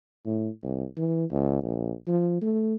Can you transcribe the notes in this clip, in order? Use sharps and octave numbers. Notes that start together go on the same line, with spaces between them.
A2
C2
E3
C#2
A#1
F3
A3